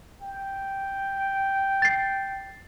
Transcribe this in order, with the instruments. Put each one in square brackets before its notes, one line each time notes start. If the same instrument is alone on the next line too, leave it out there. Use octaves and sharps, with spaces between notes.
[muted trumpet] G5
[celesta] A6 C7